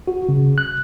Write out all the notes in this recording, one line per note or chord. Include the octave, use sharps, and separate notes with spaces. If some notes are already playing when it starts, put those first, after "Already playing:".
F#4
C#3
F#6